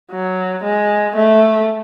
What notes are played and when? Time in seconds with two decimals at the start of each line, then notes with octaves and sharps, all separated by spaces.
0.12 F#3
0.64 G#3
1.17 A3